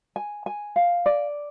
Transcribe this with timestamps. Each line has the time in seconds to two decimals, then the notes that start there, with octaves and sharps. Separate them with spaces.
0.16 G#5
0.46 G#5
0.76 F5
1.06 D5